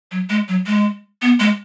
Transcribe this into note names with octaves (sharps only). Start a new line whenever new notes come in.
F#3
G#3
F#3
G#3
B3
G#3